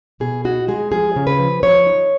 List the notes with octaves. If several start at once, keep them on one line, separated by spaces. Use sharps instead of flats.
B2 G#4
D#4 F#4
G#3 G#4
F3 G#4
C#3
B4
F3
F3 C#5
D#4